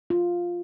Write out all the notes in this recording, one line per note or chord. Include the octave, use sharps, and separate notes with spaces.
F4